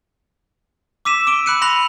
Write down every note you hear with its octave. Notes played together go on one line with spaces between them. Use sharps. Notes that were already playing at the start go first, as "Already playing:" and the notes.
D6 E6 B6 D#7 E7
D6 E6 D7 G7
B5 D6 F#6 C#7 D#7
B5 C6 F#6 A#6 F7 F#7